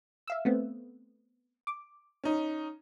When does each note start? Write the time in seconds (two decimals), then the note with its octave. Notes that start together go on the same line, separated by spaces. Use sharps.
0.28 E5 F5 E6
0.45 A3 B3 C4
1.67 D6
2.24 C#4 D#4